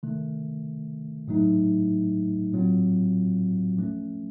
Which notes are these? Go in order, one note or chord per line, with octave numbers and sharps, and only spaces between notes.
C3 D#3 A3
A2 F#3 A3 D#4
A2 F#3 C4 F4
F3 A3 C#4